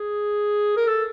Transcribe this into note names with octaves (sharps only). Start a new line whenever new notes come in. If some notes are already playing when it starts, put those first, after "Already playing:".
Already playing: G#4
A#4
A4